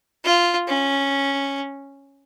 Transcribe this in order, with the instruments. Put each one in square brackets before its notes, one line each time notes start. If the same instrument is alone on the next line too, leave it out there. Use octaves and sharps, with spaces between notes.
[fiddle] F4
C#4